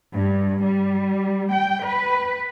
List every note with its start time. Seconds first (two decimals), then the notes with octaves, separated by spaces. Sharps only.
0.14 G2
0.63 G3
1.52 G5
1.85 B4